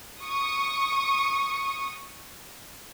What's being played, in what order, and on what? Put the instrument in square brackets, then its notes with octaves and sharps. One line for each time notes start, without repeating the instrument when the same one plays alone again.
[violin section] C#6 D#6